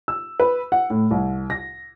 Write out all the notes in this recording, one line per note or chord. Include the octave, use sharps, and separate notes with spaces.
E6
B4
F#5
A2
C2
A#6